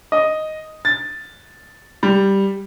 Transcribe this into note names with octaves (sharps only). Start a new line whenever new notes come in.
D#5
A6
G3